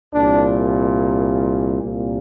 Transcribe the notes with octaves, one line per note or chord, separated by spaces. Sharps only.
C2 A#2 D4
C2 A#2